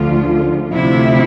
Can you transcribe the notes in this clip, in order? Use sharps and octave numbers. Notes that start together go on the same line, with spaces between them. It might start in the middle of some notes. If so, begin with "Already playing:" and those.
Already playing: D2 D3 F3 F4
D2 C3 F3 E4